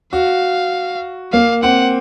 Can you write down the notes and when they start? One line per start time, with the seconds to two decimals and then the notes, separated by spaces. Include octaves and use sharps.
0.13 F#4 F5
1.32 A#3 F5
1.63 C4 F#5